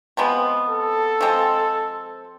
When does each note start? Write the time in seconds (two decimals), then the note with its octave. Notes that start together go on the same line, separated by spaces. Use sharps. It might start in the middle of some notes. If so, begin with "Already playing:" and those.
0.17 C3 F3 G#3 B3
0.69 A4
1.21 F3 G#3 C4